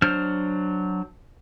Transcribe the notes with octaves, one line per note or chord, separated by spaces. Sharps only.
F#3 D4 C5 F6